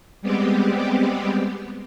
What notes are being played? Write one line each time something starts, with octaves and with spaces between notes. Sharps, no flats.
G3 G#3 B3 C4 G4